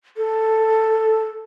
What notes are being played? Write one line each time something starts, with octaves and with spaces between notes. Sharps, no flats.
A4